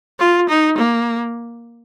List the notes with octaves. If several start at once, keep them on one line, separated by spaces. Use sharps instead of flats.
F4
D#4
A#3